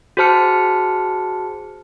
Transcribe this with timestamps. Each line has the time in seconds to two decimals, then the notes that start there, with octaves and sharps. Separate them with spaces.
0.17 F#4 G#4 C5 A5 F6 C#7